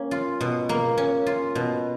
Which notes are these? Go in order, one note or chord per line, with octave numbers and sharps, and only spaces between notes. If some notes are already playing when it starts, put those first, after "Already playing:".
Already playing: A#3 C#4
F4
B2
A#3
C#4
F4
B2